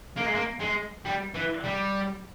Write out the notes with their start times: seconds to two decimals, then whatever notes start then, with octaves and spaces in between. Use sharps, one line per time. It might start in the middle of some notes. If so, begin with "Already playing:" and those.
0.16 A#3
0.26 G#3
0.35 A#3
0.61 G#3
1.05 G3
1.34 E3
1.64 G3